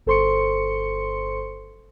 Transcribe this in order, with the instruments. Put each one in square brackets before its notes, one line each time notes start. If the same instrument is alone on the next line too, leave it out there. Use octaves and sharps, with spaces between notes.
[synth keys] G1 A4 C5 C6 C#6 C#7